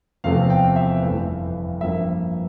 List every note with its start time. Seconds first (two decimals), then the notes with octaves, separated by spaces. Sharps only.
0.24 E2 C3 F3 A3 C4 F5
0.50 G5
0.76 E5
1.02 G1 F2 E3 A3
1.81 G2 F3 A#3 E5